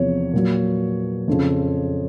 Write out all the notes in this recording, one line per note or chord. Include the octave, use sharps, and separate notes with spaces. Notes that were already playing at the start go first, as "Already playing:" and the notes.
Already playing: E2 C3 F3 C#5
A#2 F#3
F2 C#3 F3